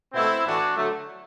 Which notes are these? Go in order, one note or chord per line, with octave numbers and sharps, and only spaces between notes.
B2 A3 C4 E4
A2 E3 A3 D4 F#4
D3 F#3 A3